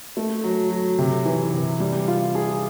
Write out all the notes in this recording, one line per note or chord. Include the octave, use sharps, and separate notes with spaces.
A3
F#3
F#3
C3
E3
C3
G3
F4
G#4